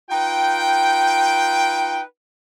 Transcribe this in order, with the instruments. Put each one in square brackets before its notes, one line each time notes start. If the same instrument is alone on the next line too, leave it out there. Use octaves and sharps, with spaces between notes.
[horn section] D#4 F4 B4 G5